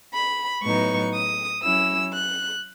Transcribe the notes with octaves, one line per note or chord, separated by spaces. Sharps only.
B5
A2 F#3 B3 D#4 C#6
D#6
F#3 C#4 E4 E6
F#6